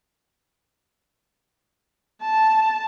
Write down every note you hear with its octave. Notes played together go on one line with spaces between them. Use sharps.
A5